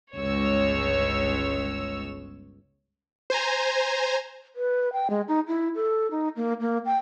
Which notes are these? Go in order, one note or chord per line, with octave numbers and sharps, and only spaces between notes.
G1 C#2 G#3 C#5 E6
C5 G#5 A#5
B4
G5
G#3
D#4
E4
A4
D#4
A#3
A#3
G5